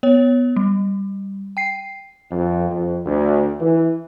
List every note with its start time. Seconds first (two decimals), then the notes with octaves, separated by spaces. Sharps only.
0.03 B3 C#5
0.56 G3
1.57 G5 C7
2.31 F2
2.70 F2
3.06 D2
3.60 E3